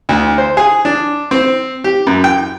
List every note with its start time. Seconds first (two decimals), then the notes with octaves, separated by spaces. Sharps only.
0.09 D2
0.38 C5
0.57 G#4
0.85 D4
1.31 C4
1.84 G4
2.07 F#2
2.24 G5